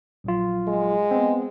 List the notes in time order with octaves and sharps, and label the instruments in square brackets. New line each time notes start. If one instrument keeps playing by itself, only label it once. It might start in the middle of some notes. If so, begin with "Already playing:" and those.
[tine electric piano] A#1 F#3 F4
[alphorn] G#3
[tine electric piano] B3 C4